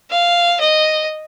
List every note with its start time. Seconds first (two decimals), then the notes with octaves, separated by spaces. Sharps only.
0.11 F5
0.61 D#5